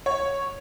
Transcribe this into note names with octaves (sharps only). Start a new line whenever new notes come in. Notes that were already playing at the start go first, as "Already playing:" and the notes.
C#5